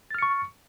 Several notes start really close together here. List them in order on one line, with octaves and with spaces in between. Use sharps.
A6 F6 C#7 C#6